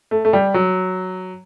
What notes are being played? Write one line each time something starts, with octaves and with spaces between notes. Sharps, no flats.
A3
A3
G3
F#3